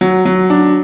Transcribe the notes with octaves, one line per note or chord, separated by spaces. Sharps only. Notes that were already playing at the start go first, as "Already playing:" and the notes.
F#3
F#3
D4